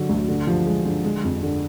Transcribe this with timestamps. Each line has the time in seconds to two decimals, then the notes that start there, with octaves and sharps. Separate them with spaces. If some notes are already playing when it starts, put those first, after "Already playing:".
Already playing: D3 F#3 D4
0.09 D2
0.28 D3
0.47 F3
0.66 G#3
0.85 D3
1.04 G#3
1.24 F2
1.43 D3